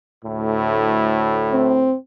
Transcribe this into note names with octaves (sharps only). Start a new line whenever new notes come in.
D2 A2
C4